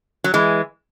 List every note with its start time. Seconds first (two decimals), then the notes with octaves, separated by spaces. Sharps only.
0.24 F#3
0.34 E3 G#3